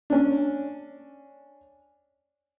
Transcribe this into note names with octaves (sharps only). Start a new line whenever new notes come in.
C#4 D4